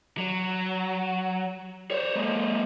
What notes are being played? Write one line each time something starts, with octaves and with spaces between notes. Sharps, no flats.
F#3
C5 C#5
G#3 A#3